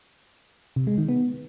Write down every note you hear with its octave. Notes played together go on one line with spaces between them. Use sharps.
C3
G#3
D#3
B3